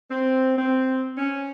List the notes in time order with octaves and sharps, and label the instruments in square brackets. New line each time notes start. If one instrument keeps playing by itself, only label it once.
[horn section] C4
C4
C#4